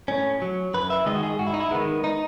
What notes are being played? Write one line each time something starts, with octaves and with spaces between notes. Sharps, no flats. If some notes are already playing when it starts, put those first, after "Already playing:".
A2 C#4
F#3
F#2 B4
E5
D#3 G#3 D#5
F#4
G#4
G#2 F#4
E4
D#4
E4
D#3 G#3 B3
D#4